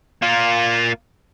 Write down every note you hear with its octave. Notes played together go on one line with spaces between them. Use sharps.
A#3 F4